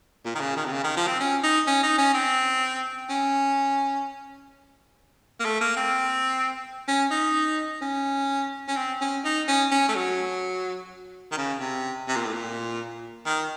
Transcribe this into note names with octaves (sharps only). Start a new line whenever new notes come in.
A#2
D#3
C#3
D#3
C3
C#3
D#3
F3
C4
C#4
D#4
C#4
D#4
C#4
C4
C#4
A#3
A3
A#3
C4
C#4
D#4
C#4
C#4
C4
C#4
D#4
C#4
C#4
A3
F#3
D#3
C#3
C3
C3
A#2
A2
A#2
D#3